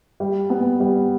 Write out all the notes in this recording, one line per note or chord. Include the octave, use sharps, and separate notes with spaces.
G3
B3
G3